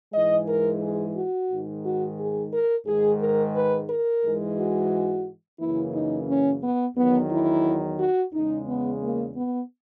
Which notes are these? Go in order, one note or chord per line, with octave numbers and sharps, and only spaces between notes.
G#2 E3 G#3 D#5
A#4
G#4
F#4
G#2 D#3 G#3
F#4
G#4
A#4
G#2 D#3 G#3 G#4
A#4
B4
A#4
G#2 E3 G#3
F#4
F#2 C#3 E3 A#3 E4
D#4
C#4
B3
E2 D#3 F#3 B3
E4
F#4
E2 C#3 G#3 D#4
B3
A#3
B3